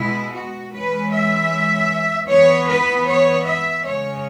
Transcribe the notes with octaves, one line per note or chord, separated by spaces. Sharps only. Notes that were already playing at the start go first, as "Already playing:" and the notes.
Already playing: B2 G#3 B3 E4
F#4
E3 G#3 C#4 B4
E5
E3 B3 C#5
B4
C#5
E5
C#3 G#3 C#4 C#5